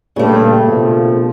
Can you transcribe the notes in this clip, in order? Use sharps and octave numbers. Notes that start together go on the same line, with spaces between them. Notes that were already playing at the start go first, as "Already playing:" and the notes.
G2 A#2 C#3 A3
A#1 B2 F3